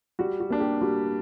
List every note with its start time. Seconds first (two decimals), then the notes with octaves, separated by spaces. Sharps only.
0.19 G3 F#4
0.40 F#4
0.50 A#3 D4
0.60 G4
0.81 G3 F#4